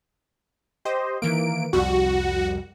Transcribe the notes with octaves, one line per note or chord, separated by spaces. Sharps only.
G4 C5 D#5
D#3 E3 A#3 D7
C2 F2 G3 F#4